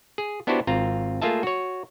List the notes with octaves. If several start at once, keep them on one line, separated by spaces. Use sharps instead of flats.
G#4
B3 D4 E4 F#4 G4 C5
G#1 C4 F4 A#5
A3 A#3 F4 G#4 E5 A5
F#4 C#5